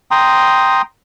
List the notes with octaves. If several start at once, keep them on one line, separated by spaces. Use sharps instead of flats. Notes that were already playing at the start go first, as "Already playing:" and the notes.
G5 A#5 C6 D#6